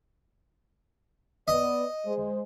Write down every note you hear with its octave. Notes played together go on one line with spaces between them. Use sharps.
B3 B4 D5 D#5
G#3 C5